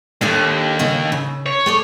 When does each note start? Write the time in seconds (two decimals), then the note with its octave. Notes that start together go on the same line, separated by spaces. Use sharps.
0.21 D#2 G#2 D4 G4 A4
0.79 C#3 D#4 F#4
1.12 C#3
1.46 C#5
1.66 A3 G#4 D5